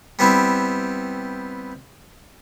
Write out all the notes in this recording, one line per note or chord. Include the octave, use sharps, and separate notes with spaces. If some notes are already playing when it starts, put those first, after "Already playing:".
G3 B3 C4 E4